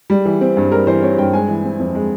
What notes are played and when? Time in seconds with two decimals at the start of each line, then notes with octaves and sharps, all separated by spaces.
0.10 G3
0.25 E3
0.41 C4
0.57 G2
0.72 G3 A#4
0.87 E3 C5
1.02 C4 C#5
1.18 G2 G5
1.33 G#3 G#5
1.48 E3
1.64 C4
1.79 F2
1.95 G#3